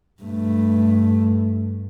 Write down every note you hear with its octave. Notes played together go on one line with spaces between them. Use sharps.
G2 A3